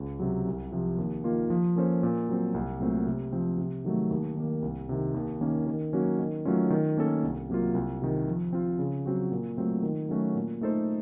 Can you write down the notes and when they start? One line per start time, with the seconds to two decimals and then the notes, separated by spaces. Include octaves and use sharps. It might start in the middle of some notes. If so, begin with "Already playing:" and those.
Already playing: C#2
0.20 C3 F#3
0.47 C2
0.72 C3 F3
0.98 D#2
1.24 D#3 A#3 F4
1.50 F3
1.76 A#3 C#4 A4 C5
2.03 A#2
2.29 F#3 C4
2.54 C2
2.80 A#2 F#3 A3 C4
3.07 C3
3.32 F3 C4
3.58 C3
3.84 D#3 F#3 A3
4.11 D#2
4.36 D#3 A#3
4.62 C2
4.89 C3 D#3
5.14 D#2
5.41 D#3 A#3 C#4
5.67 D#3
5.93 F#3 A#3 C#4 F#4
6.19 D#3
6.45 F#3 A3 C#4 F4
6.70 D#3
6.97 A#3 C#4 A4
7.23 C2
7.50 C3 F#3 A#3 F4
7.75 C2
8.02 C3 D#3
8.28 F3
8.53 C4 F4
8.79 C#3
9.05 F#3 C4 F#4
9.32 A#2
9.57 F#3 A3 C4 F4
9.83 D#3
10.09 F#3 A3 C#4 F#4
10.35 A#2
10.61 A3 D#4 A4 C5